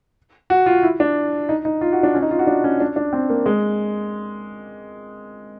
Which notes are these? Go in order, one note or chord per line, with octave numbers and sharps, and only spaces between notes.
F#4
F4
E4
D4
D#4
D#4
F4
F#4
D4
C#4
D#4
F4
F#4
D4
C#4
D4
D4
C4
A#3
G#3